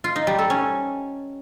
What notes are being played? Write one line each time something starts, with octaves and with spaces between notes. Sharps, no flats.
F4
D#4
G3
A4
C#4